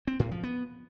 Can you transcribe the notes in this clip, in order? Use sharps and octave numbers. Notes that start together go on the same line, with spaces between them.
C4
A2
F3
B3